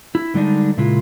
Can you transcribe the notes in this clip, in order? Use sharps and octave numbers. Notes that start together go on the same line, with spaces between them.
E4
D3 G3 G#3 D4 D#4
A#2 C#3 G#3 E4 F4